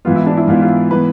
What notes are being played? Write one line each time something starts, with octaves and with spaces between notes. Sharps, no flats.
G#2 E3 B3 F4
E4
D4
E4
G#2 E3 B3 F4
F4
E3 B3 B4